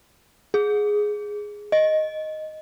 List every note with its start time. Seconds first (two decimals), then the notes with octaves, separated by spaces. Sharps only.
0.54 G#4
1.72 D#5